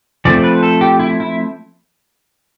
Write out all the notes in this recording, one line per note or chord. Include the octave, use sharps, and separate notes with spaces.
F3 A3 C4 D5
B4
A4
G4
E4
E4